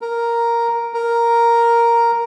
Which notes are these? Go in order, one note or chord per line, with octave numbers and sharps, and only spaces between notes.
A#4
A#4